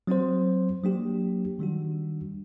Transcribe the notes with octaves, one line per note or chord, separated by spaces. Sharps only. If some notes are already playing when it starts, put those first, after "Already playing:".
F#3 C4 F#4 C5
F#3 A#3 D4 G4
D#3 G3 D4 F#4